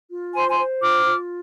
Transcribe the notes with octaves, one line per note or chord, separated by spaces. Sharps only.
F4
C5 G#5 C6
G#5 C6
C5
F4 D6 F6
F4